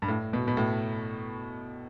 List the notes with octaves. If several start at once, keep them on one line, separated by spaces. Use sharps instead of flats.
G2
A2
B2
B2
A2